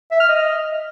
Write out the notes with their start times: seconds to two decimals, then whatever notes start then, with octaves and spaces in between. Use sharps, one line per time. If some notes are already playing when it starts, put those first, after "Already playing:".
0.11 E5
0.20 F6
0.29 D#5